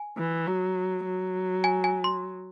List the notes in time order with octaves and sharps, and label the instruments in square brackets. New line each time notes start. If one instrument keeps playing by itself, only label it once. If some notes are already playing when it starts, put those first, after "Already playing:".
Already playing: [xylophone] G#5
[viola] E3
F#3
F#3
[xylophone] G#5
G#5
C6